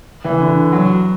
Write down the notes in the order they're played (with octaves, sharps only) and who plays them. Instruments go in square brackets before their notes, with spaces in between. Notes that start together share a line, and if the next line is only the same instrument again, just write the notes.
[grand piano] E3
D3
F#3